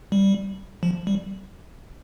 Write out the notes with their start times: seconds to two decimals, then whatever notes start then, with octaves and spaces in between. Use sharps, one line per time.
0.12 G3
0.83 F3
1.07 G3